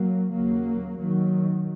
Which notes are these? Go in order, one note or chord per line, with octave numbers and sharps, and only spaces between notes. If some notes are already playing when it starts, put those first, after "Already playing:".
Already playing: F#3 A#3
D#2 C#3 F#3 A#3
D#3 F#3